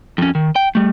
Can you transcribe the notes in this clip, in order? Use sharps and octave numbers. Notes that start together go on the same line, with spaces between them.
F2 C#4
D#3
G5
G3 A3